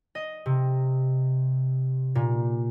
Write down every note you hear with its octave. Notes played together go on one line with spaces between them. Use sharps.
D#5
C3
A#2